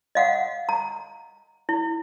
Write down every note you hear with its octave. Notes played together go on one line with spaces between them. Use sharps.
D#5 F5 F#5
A#5
E4